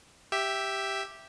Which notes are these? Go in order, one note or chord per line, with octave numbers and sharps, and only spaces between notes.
G4 E5